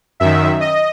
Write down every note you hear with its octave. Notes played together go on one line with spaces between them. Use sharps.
F#2 D#3 E5
D#5